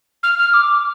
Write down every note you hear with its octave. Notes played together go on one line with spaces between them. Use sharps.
F6
F6
D6